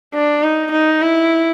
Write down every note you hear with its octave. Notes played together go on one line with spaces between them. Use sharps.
D4
D#4
D#4
E4